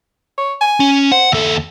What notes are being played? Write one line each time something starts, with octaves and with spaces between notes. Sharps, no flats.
C#5
G#5
C#4
C5 F#5
D#2 A4 E5